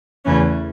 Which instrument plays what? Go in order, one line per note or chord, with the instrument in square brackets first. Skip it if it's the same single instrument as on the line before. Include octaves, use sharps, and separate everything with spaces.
[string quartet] E2 C#3 E3 A3 C#4